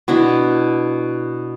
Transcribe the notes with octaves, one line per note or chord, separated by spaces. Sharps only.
B2 D4 E4